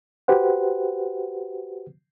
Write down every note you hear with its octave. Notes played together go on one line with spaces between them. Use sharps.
F#4 G4 B4 C5 F#5